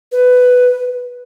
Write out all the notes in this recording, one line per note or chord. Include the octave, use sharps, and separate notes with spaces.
B4